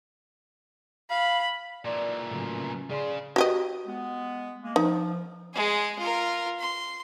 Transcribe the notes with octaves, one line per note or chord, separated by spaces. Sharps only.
F5 B5
A#2 E3 D5
A2 C#3 F#3 C#4
C#3 G#4 D5 C6
F#4 G4 D#5
G#3 B3
G#3 A#3
F3 D#4
G#3 G#4
F4 A#4
C6